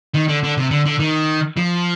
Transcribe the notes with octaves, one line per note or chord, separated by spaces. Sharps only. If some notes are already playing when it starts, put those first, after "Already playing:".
D#3
D3
D3
C3
D3
D3
D#3
F3